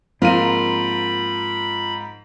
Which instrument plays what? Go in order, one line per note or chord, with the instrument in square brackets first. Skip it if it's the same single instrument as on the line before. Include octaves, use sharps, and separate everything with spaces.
[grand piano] G#2 A#4 D#7 [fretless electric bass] F3 A#3 C4 [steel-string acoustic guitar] F4 [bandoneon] B5